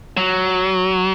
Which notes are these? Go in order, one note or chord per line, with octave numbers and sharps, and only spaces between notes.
F#3